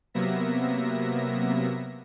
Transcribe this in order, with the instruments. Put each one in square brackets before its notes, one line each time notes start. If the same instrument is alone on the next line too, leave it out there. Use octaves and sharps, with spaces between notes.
[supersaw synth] C3 F#3 A#3 B3 E5 A#6